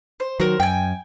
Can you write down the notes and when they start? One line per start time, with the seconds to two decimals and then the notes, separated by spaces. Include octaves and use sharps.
0.20 C5
0.40 D#3 F#3 A#4 C5
0.60 F#2 G5 G#5